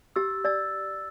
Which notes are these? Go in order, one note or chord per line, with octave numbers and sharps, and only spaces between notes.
G4 E6 A6
D5 E6 A6